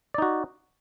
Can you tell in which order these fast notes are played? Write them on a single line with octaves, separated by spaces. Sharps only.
D5 D#4 F#4